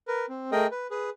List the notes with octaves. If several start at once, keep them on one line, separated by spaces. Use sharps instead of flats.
A#4 B4
C4
A3 G#4 A#4 D#5 G5
B4
G#4 B4